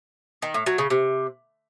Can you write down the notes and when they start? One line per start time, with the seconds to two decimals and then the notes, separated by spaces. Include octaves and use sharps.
0.42 D#3
0.54 A2
0.66 F#3
0.78 C#3
0.90 C3